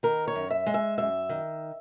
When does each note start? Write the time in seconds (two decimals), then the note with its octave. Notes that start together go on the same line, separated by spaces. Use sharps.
0.03 D#3 A#4
0.28 C#5
0.35 F#2
0.50 E5
0.66 G#3
0.74 E5
0.98 F#2 E5
1.29 D#3